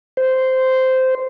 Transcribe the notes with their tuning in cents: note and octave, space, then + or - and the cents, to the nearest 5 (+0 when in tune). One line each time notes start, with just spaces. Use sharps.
C5 -10